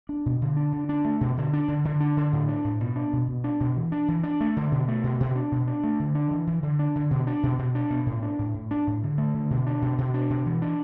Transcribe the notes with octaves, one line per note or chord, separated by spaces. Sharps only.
D4
B2
D3
D4
D3
D4
A3
B2
D3
D4
D3
D3
D4
D3
A2
D4
A2
B2
D4
B2
B2
D4
B2
E3
D4
E3
D4
A3
D3
B2
A3
B2
B2
D4
B2
D4
A3
D3
D4
E3
E3
D3
D4
D3
B2
D4
B2
B2
D4
B2
A2
D4
A2
A2
D4
A2
D3
A3
D3
B2
D4
B2
B2
D4
B2
E3
D4